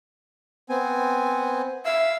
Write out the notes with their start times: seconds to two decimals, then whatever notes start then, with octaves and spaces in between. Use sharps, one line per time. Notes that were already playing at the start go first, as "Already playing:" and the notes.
0.69 B3 C4 G#5
1.85 E5 F5 E6